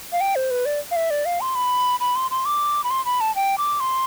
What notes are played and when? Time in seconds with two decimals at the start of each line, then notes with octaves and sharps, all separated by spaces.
0.13 F5
0.21 G5
0.36 C5
0.51 B4
0.66 D5
0.91 F5
0.96 E5
1.10 D5
1.26 F5
1.41 C6
1.55 B5
2.00 B5
2.16 C6
2.31 C6
2.45 D6
2.84 B5
2.90 C6
3.05 B5
3.21 A5
3.36 G5
3.58 D6
3.80 C6